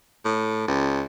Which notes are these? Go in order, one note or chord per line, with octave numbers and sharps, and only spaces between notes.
A2
C#2